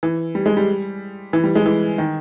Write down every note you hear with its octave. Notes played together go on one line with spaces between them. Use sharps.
E3
G3
G#3
G3
E3
G3
G#3
E3
D#3